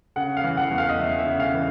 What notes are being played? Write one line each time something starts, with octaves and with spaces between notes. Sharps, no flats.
C#3 F#5
F5
E3
F#5
E2
F5
D#5
E2 E5
E5
C#3
F5
E3